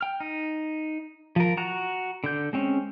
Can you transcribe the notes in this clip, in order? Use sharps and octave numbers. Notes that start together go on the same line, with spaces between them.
G5 F6
D#4
F3 A#4
F#4 A#5 F#6
D3 G6
G#3 C4 C#4